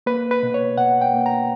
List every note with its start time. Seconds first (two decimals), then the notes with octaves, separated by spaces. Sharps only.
0.06 A#3 B4
0.31 B4
0.43 B2
0.54 C#5
0.77 B2 F#5
1.01 G5
1.14 A#3
1.26 A#5